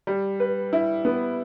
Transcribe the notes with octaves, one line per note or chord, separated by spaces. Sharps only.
G3
B4
E4
B3